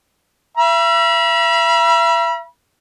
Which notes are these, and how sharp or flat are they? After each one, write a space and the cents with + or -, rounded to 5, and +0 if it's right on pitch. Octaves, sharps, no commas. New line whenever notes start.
E5 +35 B5 -40